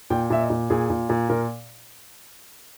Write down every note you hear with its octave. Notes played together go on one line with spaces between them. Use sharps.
A#2 G5
A#2 E5
D#5
A#2
A#2 G#4
A#2
A#2
A#2 A#4